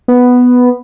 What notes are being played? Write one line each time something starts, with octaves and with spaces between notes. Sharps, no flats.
B3